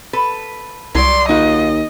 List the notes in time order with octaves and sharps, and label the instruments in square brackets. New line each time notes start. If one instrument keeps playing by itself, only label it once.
[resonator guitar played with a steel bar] A4 B4
[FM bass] C2 [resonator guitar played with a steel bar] F#3 D5 [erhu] C6
[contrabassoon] D#2 [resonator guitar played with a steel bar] D#4 F4 F#4 [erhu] D#5